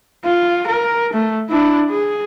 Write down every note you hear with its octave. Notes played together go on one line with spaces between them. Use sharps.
F4
A#4
A3
D4 E4
G#4